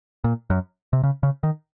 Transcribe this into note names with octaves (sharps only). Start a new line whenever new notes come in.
A#2
F#2
C3
C#3
C#3
D#3